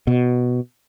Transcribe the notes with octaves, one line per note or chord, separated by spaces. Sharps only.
B2